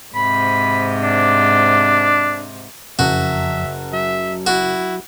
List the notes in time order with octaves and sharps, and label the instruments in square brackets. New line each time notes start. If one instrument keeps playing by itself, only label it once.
[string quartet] G#2 C3 [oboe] B5
[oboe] D4
[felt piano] F#1 [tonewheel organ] F2 [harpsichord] F#4 [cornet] E5
[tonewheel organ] F#3 [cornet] E5
[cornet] E4 [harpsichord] F#4